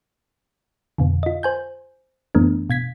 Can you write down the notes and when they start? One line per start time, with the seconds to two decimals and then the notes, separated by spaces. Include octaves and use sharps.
0.98 F2 B2 D3
1.23 F4 D#5
1.43 C5 G#5 G6
2.35 F#2 E3 A3 B3 D4
2.70 B2 G#6 B6